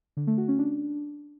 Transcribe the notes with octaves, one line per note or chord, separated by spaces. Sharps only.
D3
A3
F#4
C#4
D4